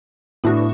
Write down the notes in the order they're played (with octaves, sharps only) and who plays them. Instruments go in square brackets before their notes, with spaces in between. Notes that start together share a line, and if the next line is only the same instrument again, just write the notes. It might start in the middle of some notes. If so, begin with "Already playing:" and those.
[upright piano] A2 [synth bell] B3 D4 F#4